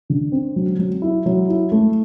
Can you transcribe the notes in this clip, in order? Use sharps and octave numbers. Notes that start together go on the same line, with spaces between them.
D3
C4
F#3
F#3
E4
F#3
E4
A3